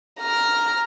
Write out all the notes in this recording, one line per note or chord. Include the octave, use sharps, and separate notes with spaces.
A#5 F6